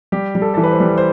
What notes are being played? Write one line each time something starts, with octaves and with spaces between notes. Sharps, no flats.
G3 G4
G3
A4
E3 A4
B4
C5
G3
C5